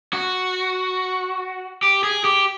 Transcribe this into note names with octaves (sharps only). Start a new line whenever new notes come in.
F#4
G4
G#4
G4